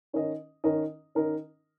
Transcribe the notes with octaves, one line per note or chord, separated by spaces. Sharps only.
D#3 C#4 A#4 D#5
D#3 C#4 A#4 D#5
D#3 C#4 A#4 D#5